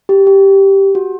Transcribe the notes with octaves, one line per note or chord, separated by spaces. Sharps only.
G4
G4
F#4